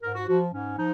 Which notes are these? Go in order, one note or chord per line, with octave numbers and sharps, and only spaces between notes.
G#2 A#4
F#4
F3 F#4
G#2 C#4
F3 D#4